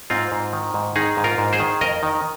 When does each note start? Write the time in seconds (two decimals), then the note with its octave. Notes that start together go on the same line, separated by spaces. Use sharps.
0.10 G#2 C4 F4
0.32 G#2
0.53 D#3
0.74 G#2
0.96 D#3 D#4 G#4
1.17 G#2
1.24 F4 A#4
1.38 G#2
1.53 G#4 C5
1.60 D#3
1.81 F2 A#4 D#5
2.03 D#3